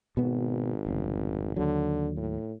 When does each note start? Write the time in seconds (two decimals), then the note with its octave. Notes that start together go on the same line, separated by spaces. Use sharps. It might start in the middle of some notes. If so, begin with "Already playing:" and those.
0.17 G#1 B2 B3
0.86 F1 C#3
1.56 D#2 D3 F#3
2.17 A2